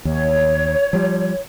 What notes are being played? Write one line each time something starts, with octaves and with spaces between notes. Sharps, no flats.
D#2 C#5
F3 G3